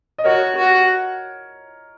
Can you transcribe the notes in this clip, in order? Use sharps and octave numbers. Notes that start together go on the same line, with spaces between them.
D#5
F#4 A#4 C#5
F#4